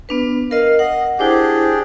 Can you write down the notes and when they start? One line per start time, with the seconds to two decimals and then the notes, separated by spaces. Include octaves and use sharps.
0.09 B3 D4 B4
0.51 A#4 D#5 F5
0.79 D#5 F#5
1.19 D4 E4 G4 G#4 C5 D6